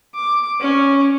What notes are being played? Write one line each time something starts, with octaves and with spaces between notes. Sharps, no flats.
D6
C#4